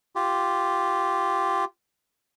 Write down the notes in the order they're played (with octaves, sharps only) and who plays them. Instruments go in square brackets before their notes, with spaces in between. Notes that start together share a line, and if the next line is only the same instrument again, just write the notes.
[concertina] F4 G4